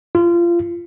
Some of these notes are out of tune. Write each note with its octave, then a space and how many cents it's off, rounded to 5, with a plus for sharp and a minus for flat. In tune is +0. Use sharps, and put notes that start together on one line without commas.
F4 -25